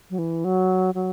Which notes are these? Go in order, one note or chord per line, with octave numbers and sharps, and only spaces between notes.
F#3
E3
F#3
F#3